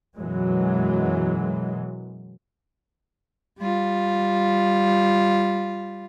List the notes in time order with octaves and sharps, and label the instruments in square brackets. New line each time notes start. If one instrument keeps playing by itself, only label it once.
[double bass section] F#2 B2 E3 F#3 G#3
[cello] G3 F4